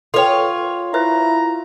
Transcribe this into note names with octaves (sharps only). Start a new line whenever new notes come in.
F4 A4 B4 C#5 G5
E4 B4 C5 E5 A#5